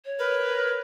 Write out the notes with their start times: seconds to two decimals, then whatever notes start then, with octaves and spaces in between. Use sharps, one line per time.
0.05 C#5
0.19 A#4 B4